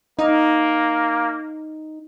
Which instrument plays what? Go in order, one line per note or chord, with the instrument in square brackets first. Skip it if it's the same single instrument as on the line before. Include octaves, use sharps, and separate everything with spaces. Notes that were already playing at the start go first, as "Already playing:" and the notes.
[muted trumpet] A#3 [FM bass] D#4